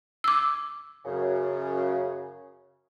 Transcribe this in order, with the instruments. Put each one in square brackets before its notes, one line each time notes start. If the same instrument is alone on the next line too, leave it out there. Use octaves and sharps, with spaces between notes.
[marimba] D6 E6
[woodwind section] F#2 C#3